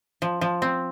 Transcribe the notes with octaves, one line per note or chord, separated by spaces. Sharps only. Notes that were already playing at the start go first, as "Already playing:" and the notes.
F3
F3
C4